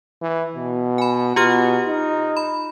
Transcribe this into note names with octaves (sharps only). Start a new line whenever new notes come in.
E3
B2
G#5 B5
B2 F4 G4 F6
D#4
B5